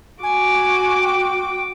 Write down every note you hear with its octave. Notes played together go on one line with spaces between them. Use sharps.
F#4 G#5 D6
G5